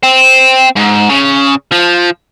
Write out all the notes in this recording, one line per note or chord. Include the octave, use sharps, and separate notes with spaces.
C4
G#2
C#3
F3